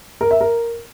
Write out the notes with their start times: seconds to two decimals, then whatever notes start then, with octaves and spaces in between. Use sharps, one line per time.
0.21 A#4
0.31 E5
0.41 A#4